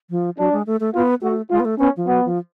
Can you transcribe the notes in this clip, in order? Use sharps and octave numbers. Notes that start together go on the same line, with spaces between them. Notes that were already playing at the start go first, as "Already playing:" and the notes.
F3
F#3 D4
G#3
A3
A3
B3 F4
A3 F#4
G#3 F4
B3
A3
B3 C#4
F3
F#3 B3
F3